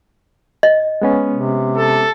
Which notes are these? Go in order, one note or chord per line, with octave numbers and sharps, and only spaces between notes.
D#5
G#3 B3 C#4
C3
A4